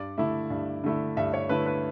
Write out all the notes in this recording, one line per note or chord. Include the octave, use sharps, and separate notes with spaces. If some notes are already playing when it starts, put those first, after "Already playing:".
Already playing: G2 D5
D3 A3 E4 E5
G2
D3 A3 E4
G2 E5
C#5
D3 A3 E4 B4
B4